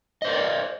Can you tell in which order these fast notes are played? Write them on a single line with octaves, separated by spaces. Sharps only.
D#5 C5 A#4 D5